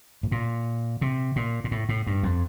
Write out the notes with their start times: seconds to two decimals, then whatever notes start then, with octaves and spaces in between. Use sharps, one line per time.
0.23 A2
0.32 A#2
1.01 C3
1.36 A#2
1.64 A#2
1.71 A2
1.89 A2
2.07 G2
2.23 F2